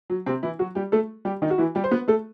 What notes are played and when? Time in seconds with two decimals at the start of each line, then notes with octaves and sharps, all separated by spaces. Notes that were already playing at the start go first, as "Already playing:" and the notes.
0.10 F#3
0.26 C3 C4
0.43 E3 E4
0.59 F#3 F#4
0.75 G3 G4
0.92 A3 A4
1.25 G3 G4
1.42 D#3 D#4
1.50 F#4
1.58 E3 E4
1.75 G3 G4
1.84 C5
1.91 B3 B4
2.08 A3 A4